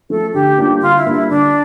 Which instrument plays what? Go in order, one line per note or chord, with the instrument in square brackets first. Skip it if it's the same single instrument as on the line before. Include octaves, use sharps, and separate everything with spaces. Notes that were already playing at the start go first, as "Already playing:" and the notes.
[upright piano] F3 A3 [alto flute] A4
[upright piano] D3 [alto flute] G4
[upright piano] G3 A#3 D4 F4
[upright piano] D3 [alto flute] F4
[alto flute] E4
[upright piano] G3 A#3 D4 F4
[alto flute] E4
[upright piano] D3 [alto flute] D4